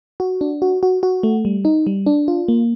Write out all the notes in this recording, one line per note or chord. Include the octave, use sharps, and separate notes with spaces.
F#4
D4
F#4
F#4
F#4
A3
G3
D#4
G3
D4
F4
A#3